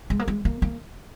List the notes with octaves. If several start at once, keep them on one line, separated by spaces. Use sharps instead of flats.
G#3
A#3
G#3
A#3
A#3